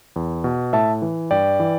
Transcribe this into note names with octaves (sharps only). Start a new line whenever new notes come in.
E2
B2
A2 E5 A5
E3
G2 D5 G5
E3